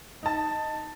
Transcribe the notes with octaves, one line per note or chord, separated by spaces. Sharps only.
D#4 A5